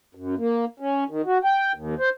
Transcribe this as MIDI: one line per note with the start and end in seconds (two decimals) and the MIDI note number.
0.15 0.35 42
0.38 0.65 58
0.80 1.04 61
1.09 1.22 51
1.26 1.38 66
1.45 1.72 79
1.75 1.95 39
1.99 2.09 72